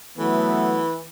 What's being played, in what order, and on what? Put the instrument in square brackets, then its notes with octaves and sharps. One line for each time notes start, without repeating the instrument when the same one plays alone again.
[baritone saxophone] E3 [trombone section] F#3 A3 B3